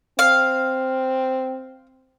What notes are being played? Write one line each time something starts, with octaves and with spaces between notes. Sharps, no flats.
C4 F5